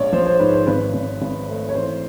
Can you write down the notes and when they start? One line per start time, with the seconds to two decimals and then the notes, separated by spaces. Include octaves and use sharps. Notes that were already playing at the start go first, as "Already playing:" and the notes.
Already playing: A#1 G#3 C#5 D5
0.12 F3 C5
0.26 C5
0.39 G#2 B4
0.54 C5
0.67 G#1 B4
0.94 G#1
1.22 G#1
1.49 A3
1.69 C#5
1.75 E3 C5